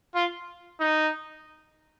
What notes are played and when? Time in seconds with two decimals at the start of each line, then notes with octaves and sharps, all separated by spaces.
0.15 F4
0.80 D#4